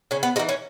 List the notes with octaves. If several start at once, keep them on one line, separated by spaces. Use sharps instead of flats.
C#3 C#4
B3
G#3 D#4
E3
C#4